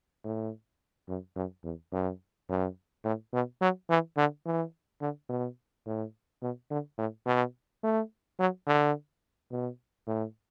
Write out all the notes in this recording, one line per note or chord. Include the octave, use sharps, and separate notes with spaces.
A2
F#2
F#2
E2
F#2
F#2
A2
B2
F#3
E3
D3
E3
D3
B2
A2
B2
D3
A2
B2
A3
F#3
D3
B2
A2